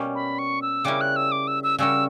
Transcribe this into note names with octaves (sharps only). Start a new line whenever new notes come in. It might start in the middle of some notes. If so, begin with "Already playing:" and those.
Already playing: B2 G3 A#3 C#4 G4
B5
C#6
E6
C#3 G3 C#4 E4 A#4 D6
F#6
E6
D6
E6
E6
C#3 G3 C#4 F#4 A#4 E6